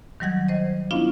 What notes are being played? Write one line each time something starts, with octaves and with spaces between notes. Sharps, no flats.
D#3 F#3 G3 F#5 G#6
C5 D#5
B3 C#4 D4 E4 F4 F5